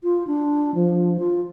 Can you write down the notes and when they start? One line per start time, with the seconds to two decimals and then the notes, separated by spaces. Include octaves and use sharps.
0.03 F4
0.27 D4
0.75 F3
1.20 F4